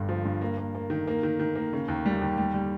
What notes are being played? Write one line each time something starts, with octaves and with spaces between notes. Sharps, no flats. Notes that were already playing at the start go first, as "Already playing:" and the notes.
Already playing: G1 G2
F3
G2
A#3
A#3
A#3
D#3
A#3
D#3
D#3
A#3
C#3
D#2
G3
D#2
G3
G3